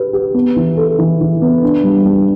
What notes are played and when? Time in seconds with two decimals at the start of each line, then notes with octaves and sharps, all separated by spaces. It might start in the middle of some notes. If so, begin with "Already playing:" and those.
Already playing: G4 B4
0.13 G4
0.34 B3
0.56 E3
0.77 A4
0.98 E3
1.21 E3
1.42 B3
1.63 D4
1.84 G3
2.05 G3